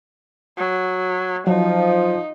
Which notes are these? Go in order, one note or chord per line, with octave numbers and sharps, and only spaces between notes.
F#3
F3 F#3 D#4